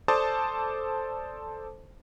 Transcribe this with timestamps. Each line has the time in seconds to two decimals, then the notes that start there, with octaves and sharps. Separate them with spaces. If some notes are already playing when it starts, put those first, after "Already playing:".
0.08 A4 C5 D5 A5 D6 D#6